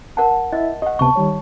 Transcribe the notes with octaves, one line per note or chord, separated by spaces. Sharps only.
A#4 F#5 A5
E4 D#5 E5
G4 D#5 F#5
C#2 C3 B3 A5 C#6
D#3 G3 C#5